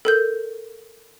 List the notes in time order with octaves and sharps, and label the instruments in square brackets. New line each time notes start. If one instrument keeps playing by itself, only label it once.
[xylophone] A4 A#4 G6